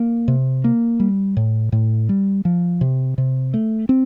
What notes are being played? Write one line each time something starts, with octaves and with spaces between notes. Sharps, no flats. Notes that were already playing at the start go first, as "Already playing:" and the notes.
Already playing: A#3
C3
A#3
G3
A2
A2
G3
F3
C3
C3
A3
C4